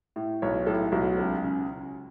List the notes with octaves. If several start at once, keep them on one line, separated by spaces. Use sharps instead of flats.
A2
B1 C#5
A2 A4
B1 F#4
C#2
C#3